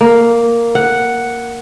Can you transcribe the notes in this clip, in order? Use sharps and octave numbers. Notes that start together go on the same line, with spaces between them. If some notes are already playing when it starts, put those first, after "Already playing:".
A#3
F#5